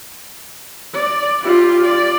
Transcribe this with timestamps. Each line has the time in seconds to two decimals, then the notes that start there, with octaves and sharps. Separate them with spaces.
0.94 D5
1.41 F4 G4
1.85 D5